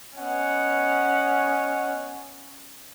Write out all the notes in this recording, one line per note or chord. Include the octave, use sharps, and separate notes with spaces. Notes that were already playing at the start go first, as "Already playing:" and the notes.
B3 C#4 D#5 F#5